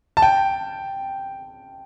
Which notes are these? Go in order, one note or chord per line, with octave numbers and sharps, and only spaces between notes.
A5
G5